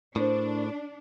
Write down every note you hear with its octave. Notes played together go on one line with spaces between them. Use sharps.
A2 C4 D4 A#4 C5